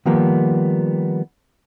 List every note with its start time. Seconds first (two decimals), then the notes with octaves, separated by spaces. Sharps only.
0.06 D#3 F3 G3 A#3 B3